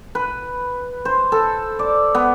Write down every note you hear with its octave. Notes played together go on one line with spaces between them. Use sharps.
B4
C5
A4
D5
B3